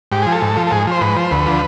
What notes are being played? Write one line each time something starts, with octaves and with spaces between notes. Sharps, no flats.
G#2 G4
F3 G#4
A4
G#2
F3
A4
G#2 G#4
F3 C5
G#2 B4
F3 C5
D2 B4
D3 F3